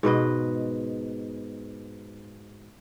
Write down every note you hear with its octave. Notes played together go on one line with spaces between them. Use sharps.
G#2 B2 B4 D#5